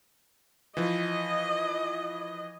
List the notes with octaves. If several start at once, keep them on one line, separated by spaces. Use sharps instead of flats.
E3 F3 D#5